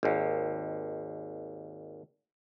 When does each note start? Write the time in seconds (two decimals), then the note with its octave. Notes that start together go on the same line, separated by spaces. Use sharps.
0.03 G#1 D#2